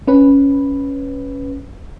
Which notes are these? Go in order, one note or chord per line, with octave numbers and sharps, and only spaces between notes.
C#4 B4